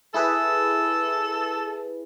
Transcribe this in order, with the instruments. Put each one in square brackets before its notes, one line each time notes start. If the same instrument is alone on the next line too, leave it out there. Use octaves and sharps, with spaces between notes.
[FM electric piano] E4 G#4 B4 [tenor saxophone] A4